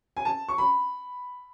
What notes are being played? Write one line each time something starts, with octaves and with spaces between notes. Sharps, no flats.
G#5
A5
C#6
B5